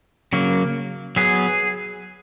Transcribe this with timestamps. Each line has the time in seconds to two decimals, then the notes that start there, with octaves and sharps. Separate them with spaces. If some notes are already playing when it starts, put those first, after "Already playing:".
0.33 C#3 F#3 A#3
1.16 F#3 B3 G#4